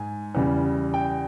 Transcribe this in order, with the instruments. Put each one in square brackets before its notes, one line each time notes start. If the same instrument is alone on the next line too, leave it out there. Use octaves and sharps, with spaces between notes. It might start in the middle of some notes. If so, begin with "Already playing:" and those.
Already playing: [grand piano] G#2 G#5
E2 C#3 G3
G5